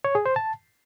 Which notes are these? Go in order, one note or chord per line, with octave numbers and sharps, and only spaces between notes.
C#5
G#4
C5
A5